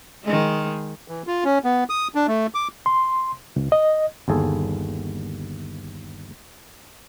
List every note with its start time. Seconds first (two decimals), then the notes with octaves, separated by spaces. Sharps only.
0.24 D#3 G#3
1.08 E3
1.27 F4
1.44 C#4
1.64 B3
1.89 D#6
2.15 D4
2.28 A3
2.54 D6
2.86 C6
3.56 C#2
3.72 D#5
4.28 G1 D#2 G#4 A4